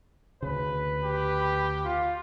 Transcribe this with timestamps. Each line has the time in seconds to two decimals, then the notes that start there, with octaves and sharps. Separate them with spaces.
0.42 D2 C#3 B4
1.03 G4
1.84 F4